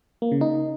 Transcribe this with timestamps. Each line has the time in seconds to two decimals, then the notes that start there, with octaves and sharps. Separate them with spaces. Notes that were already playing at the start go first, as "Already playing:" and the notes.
0.22 A#3
0.32 C#3
0.41 D#4